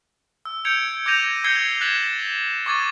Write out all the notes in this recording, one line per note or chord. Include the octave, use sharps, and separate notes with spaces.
E6
G6 G#6 C#7 D7 F7
D6 G6 G#6 A#6 D#7 F7
E6 G6 G#6 C7 C#7 G7
F#6 A6 B6 E7 F#7
C#6 D6 G#6 A6 D#7